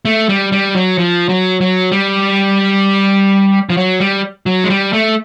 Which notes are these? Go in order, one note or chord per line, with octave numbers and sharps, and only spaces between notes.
A3
G3
G3
F#3
F3
F#3
F#3
G3
F3
F#3
G3
F#3
G#3
G3
A3